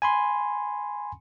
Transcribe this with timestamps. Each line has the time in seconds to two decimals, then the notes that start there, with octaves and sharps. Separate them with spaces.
0.02 G#5 B5 C6